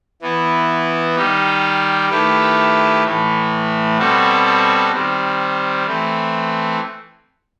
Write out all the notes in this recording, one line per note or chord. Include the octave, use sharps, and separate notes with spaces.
E3 B3 E4
D#3 G3 D#4 G4
D#3 A3 E4 G4 B4
A2 E3 A3
B2 G3 C4 F#4 A4
D#3 G3 C4
E3 A3 C4